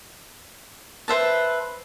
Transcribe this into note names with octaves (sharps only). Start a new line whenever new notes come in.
B4 C5 E5 A5